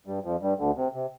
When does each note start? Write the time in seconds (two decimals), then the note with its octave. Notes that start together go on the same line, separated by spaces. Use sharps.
0.06 G2 G3
0.24 F2 F3
0.41 G2 G3
0.59 D2 D3
0.76 C3
0.94 C3